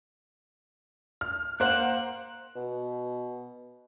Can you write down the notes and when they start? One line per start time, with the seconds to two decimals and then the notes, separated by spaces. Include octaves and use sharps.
1.21 F6
1.60 A#3 C5 F#5 F#6
2.56 B2